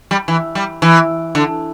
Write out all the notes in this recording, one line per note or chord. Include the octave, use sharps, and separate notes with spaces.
G3
E3
G3
E3
D3